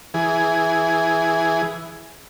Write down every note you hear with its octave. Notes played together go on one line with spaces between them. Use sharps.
E3 G#4